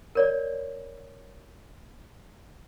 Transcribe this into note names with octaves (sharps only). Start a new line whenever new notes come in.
A#4 C#5 D5